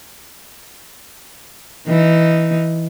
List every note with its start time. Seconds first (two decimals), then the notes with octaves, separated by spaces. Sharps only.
1.88 E3 D#4